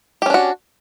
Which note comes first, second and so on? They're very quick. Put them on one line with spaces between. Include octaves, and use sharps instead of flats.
G4 C#4 D4 F#4